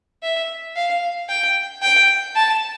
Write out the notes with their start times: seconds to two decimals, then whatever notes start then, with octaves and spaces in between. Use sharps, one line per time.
0.23 E5
0.76 F5
1.29 G5
1.82 G5
2.35 A5